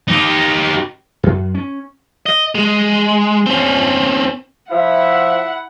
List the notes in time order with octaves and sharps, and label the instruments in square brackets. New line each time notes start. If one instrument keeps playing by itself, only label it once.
[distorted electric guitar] D#4 G4
[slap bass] F#2
C#4
[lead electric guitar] D#5
G#3
C4 C#4
[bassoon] F3 [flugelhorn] E4 [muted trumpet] E5 [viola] F#5